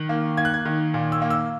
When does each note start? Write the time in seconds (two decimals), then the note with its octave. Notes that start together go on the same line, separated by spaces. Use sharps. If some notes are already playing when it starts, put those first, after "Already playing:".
Already playing: D#3 F#6
0.09 A#3
0.37 A#3 G#6
0.45 F#6
0.54 G#6
0.65 D#3
0.94 A#2
1.12 E6
1.22 A#3
1.30 E6